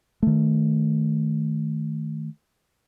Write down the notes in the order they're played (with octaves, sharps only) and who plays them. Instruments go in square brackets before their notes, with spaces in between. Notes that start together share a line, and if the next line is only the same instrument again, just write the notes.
[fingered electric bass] D#3 A3